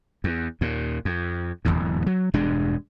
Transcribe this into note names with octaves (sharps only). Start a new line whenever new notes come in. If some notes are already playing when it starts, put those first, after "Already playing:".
E2
D#2 A#2
F2
D1 G1 E2 G#2
F#3
E1 G2 G#3 D4